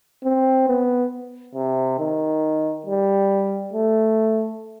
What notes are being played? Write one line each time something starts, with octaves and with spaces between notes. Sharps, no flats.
C4
B3
C3
D#3
G3
A3